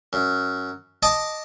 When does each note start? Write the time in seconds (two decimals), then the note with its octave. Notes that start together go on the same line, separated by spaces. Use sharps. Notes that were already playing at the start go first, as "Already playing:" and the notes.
0.13 F#2
1.03 D#5 A5 D6 D#6